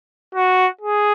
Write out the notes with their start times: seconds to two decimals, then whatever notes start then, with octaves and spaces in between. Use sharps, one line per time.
0.35 F#4
0.81 G#4